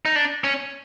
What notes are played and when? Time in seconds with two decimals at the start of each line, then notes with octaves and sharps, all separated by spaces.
0.05 D#4
0.16 D4
0.44 C#4